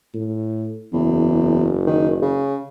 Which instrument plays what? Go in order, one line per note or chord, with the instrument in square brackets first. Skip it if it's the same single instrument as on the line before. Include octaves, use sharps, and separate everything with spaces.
[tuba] A2
[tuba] F#1 [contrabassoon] E2
[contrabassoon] D#3
C#3